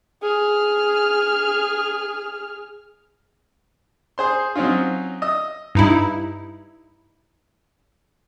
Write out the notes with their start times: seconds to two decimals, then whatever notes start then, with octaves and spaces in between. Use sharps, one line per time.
0.22 G#4 F6
4.18 G#4 C5 C6
4.56 F#3 C4 C#4 D#4 F4
5.22 D#5 D#6 E6
5.75 G2 D#4 E4